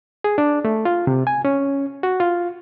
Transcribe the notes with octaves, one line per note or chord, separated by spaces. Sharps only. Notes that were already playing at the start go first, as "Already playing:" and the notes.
G#4
D4
A3
F4
C3
G#5
C#4
F#4
F4